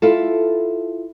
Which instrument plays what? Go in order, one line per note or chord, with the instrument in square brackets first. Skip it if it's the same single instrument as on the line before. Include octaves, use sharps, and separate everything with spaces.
[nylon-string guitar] E4 F4 A4